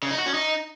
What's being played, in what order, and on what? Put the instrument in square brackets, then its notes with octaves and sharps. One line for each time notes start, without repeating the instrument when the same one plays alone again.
[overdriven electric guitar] C#3
D#4
F#4
C#4
D#4